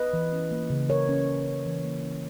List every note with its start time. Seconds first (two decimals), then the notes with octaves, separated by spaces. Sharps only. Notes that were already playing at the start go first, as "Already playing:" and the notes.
Already playing: B4 D#5
0.13 E3
0.33 C#4
0.51 A#3
0.70 C#3
0.89 C#3 A#4 C#5
1.08 C#4
1.28 E3
1.46 C#4
1.66 E3
1.85 A#3
2.03 C#4